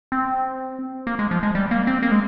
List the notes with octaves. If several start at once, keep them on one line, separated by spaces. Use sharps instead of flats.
C4
A#3
G#3
F3
G#3
G3
A#3
C4
A#3
G#3